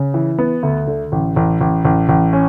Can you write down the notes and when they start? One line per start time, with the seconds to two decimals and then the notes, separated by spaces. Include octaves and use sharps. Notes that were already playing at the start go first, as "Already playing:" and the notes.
Already playing: C#3
0.14 E3
0.39 B3
0.63 D2
0.87 D3
1.12 A1
1.36 A1
1.60 A1
1.85 A1
2.09 A1
2.33 C#4